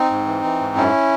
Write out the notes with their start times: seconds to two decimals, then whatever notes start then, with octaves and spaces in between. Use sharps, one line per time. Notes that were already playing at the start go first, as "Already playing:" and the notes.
Already playing: C4 D#4
0.10 G#2
0.26 E3
0.44 E3
0.60 G#2
0.76 F#2 C#4 E4